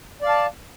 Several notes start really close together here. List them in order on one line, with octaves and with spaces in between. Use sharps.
D5 F5 A5